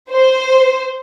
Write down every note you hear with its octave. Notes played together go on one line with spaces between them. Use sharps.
C5